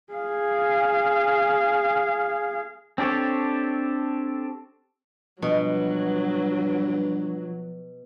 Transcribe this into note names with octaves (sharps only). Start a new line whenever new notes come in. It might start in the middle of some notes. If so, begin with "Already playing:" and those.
G#4 F5
C4 D4 G4 A4 C#5
G2 B2 F3 F#3